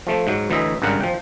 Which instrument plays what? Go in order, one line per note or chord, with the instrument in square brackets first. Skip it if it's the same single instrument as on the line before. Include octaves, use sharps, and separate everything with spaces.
[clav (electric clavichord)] F3 A3
G#2 F#3
D2 E3 F#3 D#5 E5
G#1 G2 C#3 A#4 F#5
F3 G5